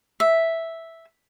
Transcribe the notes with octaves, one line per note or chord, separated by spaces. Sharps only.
E5